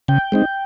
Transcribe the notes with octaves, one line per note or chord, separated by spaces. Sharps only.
C#3 G5
G#3 C4 D#4